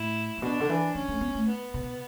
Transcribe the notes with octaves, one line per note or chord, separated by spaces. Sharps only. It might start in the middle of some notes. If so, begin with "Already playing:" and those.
Already playing: A2 E4
A2
B2 D4
D3
E3
F#3 C#4
A3
B3
A3
B3
B2